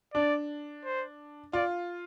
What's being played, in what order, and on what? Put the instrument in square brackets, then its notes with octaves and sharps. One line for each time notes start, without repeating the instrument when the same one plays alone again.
[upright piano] D4 [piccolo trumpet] D5
[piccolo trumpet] C5
[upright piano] F4 [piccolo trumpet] D5